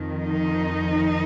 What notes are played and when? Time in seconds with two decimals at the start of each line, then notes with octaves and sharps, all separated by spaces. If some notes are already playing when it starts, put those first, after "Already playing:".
Already playing: F2 D#3
0.26 D#4